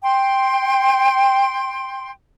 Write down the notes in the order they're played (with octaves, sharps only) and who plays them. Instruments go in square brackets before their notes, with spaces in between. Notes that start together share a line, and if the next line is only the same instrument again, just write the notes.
[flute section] G5 C6